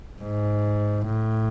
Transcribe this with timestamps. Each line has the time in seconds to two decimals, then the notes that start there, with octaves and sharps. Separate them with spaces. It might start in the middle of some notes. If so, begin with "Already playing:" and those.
0.22 G#2
1.06 A2